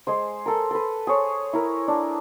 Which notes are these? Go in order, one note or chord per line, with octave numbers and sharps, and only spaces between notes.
G#3 G#4 C5
A4 A#4
A4 B4
G#4 C5 C#5
E4 A#4
D4